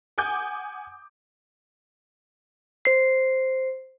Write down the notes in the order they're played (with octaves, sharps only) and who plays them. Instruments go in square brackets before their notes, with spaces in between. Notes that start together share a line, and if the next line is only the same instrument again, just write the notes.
[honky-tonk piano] F#5 G#5 D6 D#6 G6
[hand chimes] C5 C7